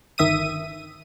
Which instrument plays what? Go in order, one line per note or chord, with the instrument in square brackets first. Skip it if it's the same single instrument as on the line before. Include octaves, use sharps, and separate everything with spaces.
[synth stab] G1 D#3 E5 D#6 D#7